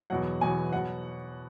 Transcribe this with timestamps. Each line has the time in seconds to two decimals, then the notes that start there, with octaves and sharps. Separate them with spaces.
0.10 E2 B2 F#3 F#5
0.41 E2 B2 F#3 G#5
0.72 B2 F#3 F#5